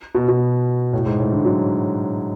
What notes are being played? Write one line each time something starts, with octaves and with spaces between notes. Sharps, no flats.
B2
B2
A2
G#2
A2
D3
F#3